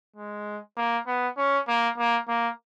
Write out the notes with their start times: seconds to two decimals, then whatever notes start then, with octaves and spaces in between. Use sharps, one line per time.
0.16 G#3
0.77 A#3
1.07 B3
1.37 C#4
1.68 A#3
1.98 A#3
2.28 A#3